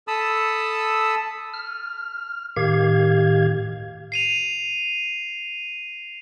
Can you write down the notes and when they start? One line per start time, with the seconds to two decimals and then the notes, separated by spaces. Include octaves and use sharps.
0.08 A4 A5 B5 D#6 E6
1.54 F6
2.56 A2 D#3 G4 F5 G#6
4.12 C7 D#7 F7